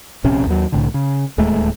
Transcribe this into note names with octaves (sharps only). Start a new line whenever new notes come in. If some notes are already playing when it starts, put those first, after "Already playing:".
D1 A#1 C3 C#4
D#2 F#3
C2 A2 D3
C#3
D1 D#2 G#3 A3